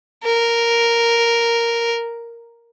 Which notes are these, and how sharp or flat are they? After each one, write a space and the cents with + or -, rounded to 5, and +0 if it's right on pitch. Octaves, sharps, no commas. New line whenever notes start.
A#4 +0